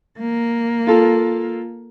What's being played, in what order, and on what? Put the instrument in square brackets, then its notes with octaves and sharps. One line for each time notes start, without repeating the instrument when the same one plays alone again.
[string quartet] A#3
[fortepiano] F4 A4